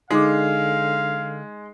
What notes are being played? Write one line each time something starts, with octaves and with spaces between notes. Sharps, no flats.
D3 G#3 D#4 F5 D6